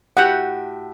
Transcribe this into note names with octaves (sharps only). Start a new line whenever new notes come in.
A2 F#4 G4 F#5